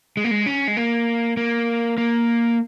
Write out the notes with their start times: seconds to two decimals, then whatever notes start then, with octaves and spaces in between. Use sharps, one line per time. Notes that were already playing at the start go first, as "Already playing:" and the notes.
0.17 G#3
0.24 A#3
0.31 G#3
0.46 C#4
0.68 G#3
0.77 A#3
1.37 A#3
1.98 A#3